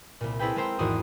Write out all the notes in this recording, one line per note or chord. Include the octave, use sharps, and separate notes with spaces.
C2 A#2
C4 E4 G#4 A4 B4 G5
G#3 C4 A#4 C5 G5
G#1 E2 F#4 D5 D#6